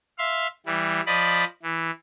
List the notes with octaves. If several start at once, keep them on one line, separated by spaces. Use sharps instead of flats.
E5 F5 C6
E3 G3
F3 D5 D#5 B5
E3